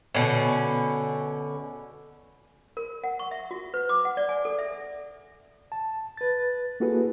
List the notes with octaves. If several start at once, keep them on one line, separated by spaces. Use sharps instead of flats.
B2 D3 C#4
A#4
F#5
C#6
E5
F#4
B4
D6
F#5
D5
G#5
A4
E5
A5
B4 A6
A#3 E4 F#4 G#4 A4 B4